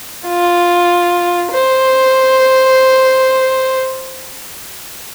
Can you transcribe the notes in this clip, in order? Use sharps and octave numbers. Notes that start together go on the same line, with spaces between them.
F4
C5